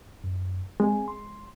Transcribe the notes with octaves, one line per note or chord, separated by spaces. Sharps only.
F#2
G#3 C4 G#5
C6